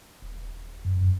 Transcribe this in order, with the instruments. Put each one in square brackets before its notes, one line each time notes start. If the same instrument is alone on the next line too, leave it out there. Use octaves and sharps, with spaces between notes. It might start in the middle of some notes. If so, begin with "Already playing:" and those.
[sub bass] D#1
F#2